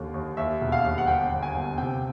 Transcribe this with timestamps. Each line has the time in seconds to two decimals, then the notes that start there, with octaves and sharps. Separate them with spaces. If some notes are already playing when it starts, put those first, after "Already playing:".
Already playing: D#2 D3
0.14 D#2
0.37 D#2 E5
0.61 E1
0.72 F5
0.85 D#2
0.98 F#5
1.07 G1 G5
1.31 G1
1.43 G#5
1.54 G1
1.78 C3 G5